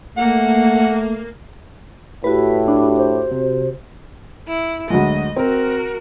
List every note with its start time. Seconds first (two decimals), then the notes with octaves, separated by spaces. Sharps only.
0.17 A3 A#3 F#5
2.24 A2 E4 F#4 G4 B4
2.68 D4
2.97 C5
3.31 C3
4.48 E4
4.90 D2 F#3 G#3 D#5
5.36 C4 F#4 A#4